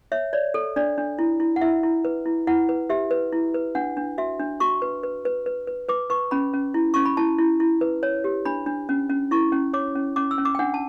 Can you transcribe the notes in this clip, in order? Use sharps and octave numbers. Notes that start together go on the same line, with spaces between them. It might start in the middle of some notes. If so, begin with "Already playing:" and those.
C#5 E5
C#5 D5
A4
D4 D5
D4
E4
E4
F#5
E4 E5
E4
B4
E4
E4 F#5
B4
G4 E5
B4
E4
B4
D4 F#5
D4
F#4 E5
D4
F#4 C#6
B4
B4
B4
B4
B4
B4 D6
B4 C#6
C#4 B5
C#4
E4
C#4 C#6
B5
E4 A5
E4
E4
B4
C#5
G4
D4 B5
D4
C#4
C#4
E4 C#6
C#4
C#5 D6
C#4
C#4 D6
E6
C#4
D6
G5
D4 F#5
A5